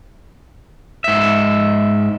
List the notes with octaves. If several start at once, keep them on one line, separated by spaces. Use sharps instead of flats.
G#2 E5